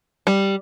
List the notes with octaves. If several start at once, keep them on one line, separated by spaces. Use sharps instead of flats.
G3